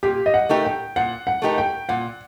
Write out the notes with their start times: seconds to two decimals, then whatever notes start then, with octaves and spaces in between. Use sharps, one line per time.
0.03 A#2 G4
0.26 D#5
0.34 F#5
0.49 A3 D#4 G4 A#4
0.65 G5
0.96 A#2 F#5
1.27 F#5
1.42 A3 D#4 G4 A#4
1.58 G5
1.89 A#2 F#5